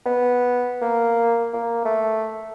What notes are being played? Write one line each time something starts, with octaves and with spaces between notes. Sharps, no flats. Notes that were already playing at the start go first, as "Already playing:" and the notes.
B3
A#3
A#3
A3